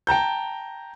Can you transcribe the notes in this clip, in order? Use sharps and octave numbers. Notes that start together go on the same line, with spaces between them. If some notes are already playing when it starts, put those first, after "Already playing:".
G5 A5 A#5 G6